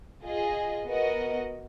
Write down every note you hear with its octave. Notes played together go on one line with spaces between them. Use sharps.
F4 G#4 D#5
B3 F#4 A#4 D#5 F#5